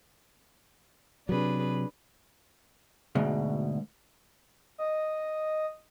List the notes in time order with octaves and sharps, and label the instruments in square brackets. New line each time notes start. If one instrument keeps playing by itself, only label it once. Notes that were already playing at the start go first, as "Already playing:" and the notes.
[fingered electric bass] C3 F#3 [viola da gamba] D4 G#4 B4
[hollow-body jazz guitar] D2 G#2 B2
[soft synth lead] D#5